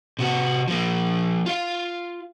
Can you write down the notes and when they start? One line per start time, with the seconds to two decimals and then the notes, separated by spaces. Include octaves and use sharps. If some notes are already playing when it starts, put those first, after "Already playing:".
0.19 C3 F#4
0.68 F3 A#3
1.46 F4 F5